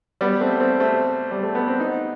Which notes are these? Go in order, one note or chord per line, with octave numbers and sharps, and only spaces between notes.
G3 B3
A3 C4
A3 C4
A3 C4
G3
A3
B3
C4
B3 D#4